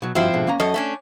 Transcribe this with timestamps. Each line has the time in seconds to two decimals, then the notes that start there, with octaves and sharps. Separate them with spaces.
0.02 B2 F#3
0.15 G2 F3 C4 E4 F#4 E5
0.33 G#2 B2 D3
0.47 A#3 C#4 A#5
0.60 F#2 A4 C#5 D#5
0.74 A3 C#4 D4